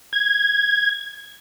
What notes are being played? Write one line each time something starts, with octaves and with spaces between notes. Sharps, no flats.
G#6